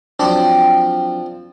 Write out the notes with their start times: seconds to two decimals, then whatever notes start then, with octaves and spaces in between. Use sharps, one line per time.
0.19 F3 F#3 C4 D4 D5 G5